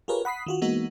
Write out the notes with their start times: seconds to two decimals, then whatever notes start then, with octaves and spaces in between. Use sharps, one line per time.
0.08 F4 G4 G#4 A#4 B4 C#5
0.25 F#5 B5 D#6 B6 C7
0.46 D#3 F4 F#4
0.62 E3 G#3 A#3 B3 D#4 F#4